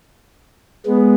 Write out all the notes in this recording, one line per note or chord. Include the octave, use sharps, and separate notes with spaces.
G#3 B3